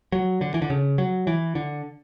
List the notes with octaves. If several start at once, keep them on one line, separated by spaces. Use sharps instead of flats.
F#3
D3
E3
D3
C#3
F#3
E3
D3